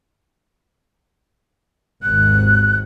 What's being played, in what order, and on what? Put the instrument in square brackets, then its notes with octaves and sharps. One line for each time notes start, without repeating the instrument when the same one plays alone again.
[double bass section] G#1 D#2 G#2 [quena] F#6